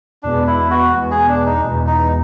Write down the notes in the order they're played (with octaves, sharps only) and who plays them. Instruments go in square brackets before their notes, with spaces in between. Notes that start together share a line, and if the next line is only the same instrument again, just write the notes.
[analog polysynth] E2 B2 G#3 B3 [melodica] D4
[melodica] E4
F#4
[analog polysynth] E2 B2 G#3 B3
[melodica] G#4
D4
D#4
[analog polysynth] E2 B2 G#3 B3
[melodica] D#4